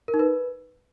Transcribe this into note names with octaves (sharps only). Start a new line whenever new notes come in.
A#4
D#4
B4